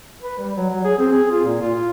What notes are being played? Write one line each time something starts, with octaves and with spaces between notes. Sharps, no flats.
B4
G3
F#3
F#3
G#4
C4
G#4
F4
A#2
F4
F4